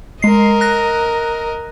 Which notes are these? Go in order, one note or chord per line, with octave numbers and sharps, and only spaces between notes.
G#3 A#4 D#5 C7
F#6 A#6